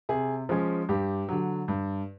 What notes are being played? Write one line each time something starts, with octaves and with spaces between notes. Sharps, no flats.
C3 G#4
F3 G#3 C#4
G2 G4
D3 F#3
G2